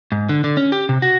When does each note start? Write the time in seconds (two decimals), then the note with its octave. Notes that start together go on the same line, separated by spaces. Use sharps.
0.12 G#2
0.29 D3
0.44 D3
0.57 C#4
0.72 G4
0.89 C3
1.02 F#4